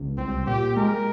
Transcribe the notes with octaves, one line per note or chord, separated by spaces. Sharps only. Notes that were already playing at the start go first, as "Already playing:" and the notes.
Already playing: C#2
C2 C4
A#2 G4
G#3 A#4